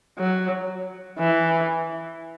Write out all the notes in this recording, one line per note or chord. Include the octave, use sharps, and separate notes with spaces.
F#3
E3